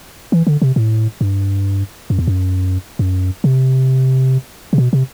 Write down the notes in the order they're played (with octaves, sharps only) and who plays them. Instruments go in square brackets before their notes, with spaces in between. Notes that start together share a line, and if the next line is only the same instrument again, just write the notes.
[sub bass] E3
D3
C3
A2
G2
F#2
E2
F#2
F#2
C3
C3
B2
C3